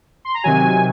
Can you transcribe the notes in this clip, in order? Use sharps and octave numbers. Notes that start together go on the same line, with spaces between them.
C6
A#5
C3 D#3 F#3 G#5